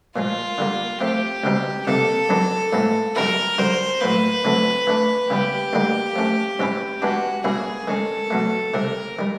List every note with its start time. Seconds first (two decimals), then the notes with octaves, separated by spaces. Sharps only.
0.15 A#2 F3 G#3 F4
0.58 D3 G3 A#3
1.01 F3 A3 C4 G4
1.44 C#2 B2 G3 C4 D#4
1.86 C2 C3 F3 A#3 D#4 A4
2.29 F#2 D#3 F#3 B3 D4
2.73 A2 F3 G#3 B3 E4
3.15 F#2 D#3 G3 B3 E4 A#4
3.58 F#2 D3 G3 C5
4.01 A2 F#3 A#3 B4
4.44 D3 F#3 A3 C4
4.87 E3 A3 D4
5.30 C#3 E3 G3 B3 G4
5.73 D2 D3 G3 A#3 D#4
6.16 F3 A3 C#4
6.59 G#2 E3 G#3 C#4 E4
7.01 E3 G#3 B3 D4 F#4
7.44 B2 G3 A#3 C#4 E4 G#4
7.88 D#3 G#3 C#4 A4
8.30 B2 F#3 A3
8.74 C2 C3 D#3 A#4
9.19 D#3 G3